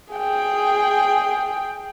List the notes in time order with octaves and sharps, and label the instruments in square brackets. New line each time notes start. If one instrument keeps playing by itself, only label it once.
[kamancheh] G#4 G5